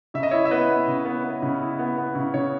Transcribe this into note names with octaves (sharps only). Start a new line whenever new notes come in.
C#3 E5
D#5
E4 C#5 E5
E5
B3 B4 D#5
B3
C#3
B3
B3
C#3
E4
B3
B3
C#3
C#3 C#5